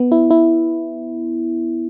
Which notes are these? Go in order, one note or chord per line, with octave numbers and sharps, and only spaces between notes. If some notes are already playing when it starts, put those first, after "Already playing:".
Already playing: B3
E4
E4